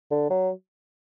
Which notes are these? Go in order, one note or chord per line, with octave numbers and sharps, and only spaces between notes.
D3
F#3